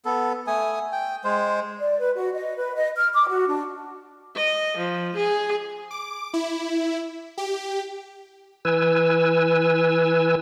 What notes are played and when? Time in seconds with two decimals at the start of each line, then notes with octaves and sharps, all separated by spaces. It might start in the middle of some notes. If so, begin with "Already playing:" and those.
0.05 B3 A4
0.47 A3 G#5 D#6
0.92 G5
1.24 G#3 C5
1.79 D5
1.99 B4
2.16 F#4
2.35 D#5
2.56 B4
2.76 D#5
2.96 F6
3.14 D6
3.28 F#4
3.48 D4
4.36 D#5
4.78 F3
5.16 G#4
5.91 D6
6.34 E4
7.38 G4
8.65 E3 B4 G#5 E6